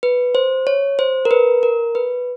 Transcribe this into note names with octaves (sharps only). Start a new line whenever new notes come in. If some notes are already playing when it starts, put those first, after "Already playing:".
B4
C5
C#5
C5
A#4
B4
A#4
B4